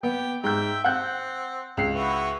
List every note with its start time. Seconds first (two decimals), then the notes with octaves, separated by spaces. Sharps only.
0.03 B3 G4 G5
0.44 G#2 E5 G5 G6
0.84 C4 F#5 F#6 G6
1.77 C#2 C7
1.94 B3 E4 F#4